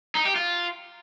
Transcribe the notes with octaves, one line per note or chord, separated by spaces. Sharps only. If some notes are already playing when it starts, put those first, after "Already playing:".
D#4
G4
F4